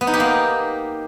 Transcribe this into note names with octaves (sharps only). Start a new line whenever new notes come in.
B3
D#4
G4
A#3